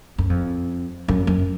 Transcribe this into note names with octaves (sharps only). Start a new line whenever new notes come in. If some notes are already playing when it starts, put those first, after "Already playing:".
F#2
F2
F#2
F#2